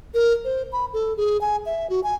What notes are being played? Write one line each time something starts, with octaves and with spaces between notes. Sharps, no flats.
A#4
C5
B5
A4
G#4
G#5
E5
F#4
G#5